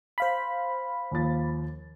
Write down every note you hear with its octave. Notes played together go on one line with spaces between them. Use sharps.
C5 F5 B5
D#2 F3 A6